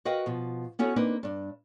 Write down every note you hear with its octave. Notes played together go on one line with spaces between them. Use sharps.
F#4 A#4 B4 D#5 F5 G5
B2 F3
B3 C#4 E4 F#4 A4 C#5
A#3 C4 D4 D#4 B4
G2 D4